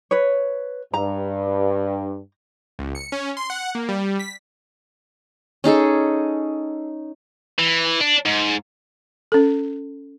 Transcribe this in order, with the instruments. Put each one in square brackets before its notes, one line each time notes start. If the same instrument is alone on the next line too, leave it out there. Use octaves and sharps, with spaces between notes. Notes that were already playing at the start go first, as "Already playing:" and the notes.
[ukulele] B4 C#5
[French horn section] G2 [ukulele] A#5
[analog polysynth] C#2
C#7
C#4
C6
F#5
A#3
G3
B6
[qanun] C#4 D#4 G#4 A4
[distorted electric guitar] E3
D4
G#2
[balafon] C#4 A4